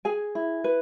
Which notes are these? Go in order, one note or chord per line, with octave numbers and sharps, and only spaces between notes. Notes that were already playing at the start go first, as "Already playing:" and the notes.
G#4 G#5
E4
B4